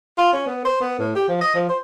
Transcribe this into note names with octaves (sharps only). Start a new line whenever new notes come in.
F4
C#4
B3
C5
B3
A2
G4
F3
D#5
F3
C5